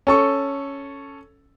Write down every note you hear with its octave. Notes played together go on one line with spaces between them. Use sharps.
C#4 A4 C#6